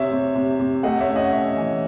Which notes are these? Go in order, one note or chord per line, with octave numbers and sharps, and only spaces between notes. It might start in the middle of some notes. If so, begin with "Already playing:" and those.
Already playing: C3 C#5 E5
C3
C3
C3
A3 D#5 F#5
C#5 E5
C#4
D#5 F#5
C#4 C#5 E5
E3